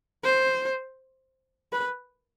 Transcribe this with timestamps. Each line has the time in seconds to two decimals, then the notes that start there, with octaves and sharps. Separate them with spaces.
0.24 C5
1.73 B4